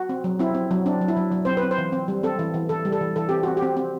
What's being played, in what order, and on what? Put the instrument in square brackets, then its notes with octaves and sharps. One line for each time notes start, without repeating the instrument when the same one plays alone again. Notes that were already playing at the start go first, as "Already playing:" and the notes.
Already playing: [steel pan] F#4
C4
F#3
C4 E4
C4
F#3
C4 D4
F#3
E4
F#3
F#3
C4 C5
B4
C4
C5
E3
C4
G3
C4 A4
E3
E3
E3 A4
G3
A4
E3
E3 A4
C4 G4
C4 F#4
G4
C4
C4